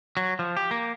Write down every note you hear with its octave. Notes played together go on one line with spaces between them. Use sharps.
F#3
F3
G4
A#3